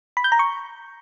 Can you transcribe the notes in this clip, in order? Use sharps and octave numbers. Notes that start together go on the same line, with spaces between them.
B5
G6
A#5
C#6